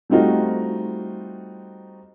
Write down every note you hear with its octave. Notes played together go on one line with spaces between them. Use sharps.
G3 A3 C4 D#4 F4 F#4